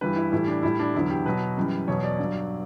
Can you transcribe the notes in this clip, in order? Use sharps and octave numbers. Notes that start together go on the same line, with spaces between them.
G2 E3 G3 B4
E4
A2 E3 G3 E4
D4
A2 G3 E4
D4
E2 D3 F#3 E4
G4
B2 F#3 B4
F#2 E3 G3
E2 B2 F#3 C#5
D5
G2 F#3